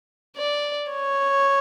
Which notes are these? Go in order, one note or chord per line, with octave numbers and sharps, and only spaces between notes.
D5
C#5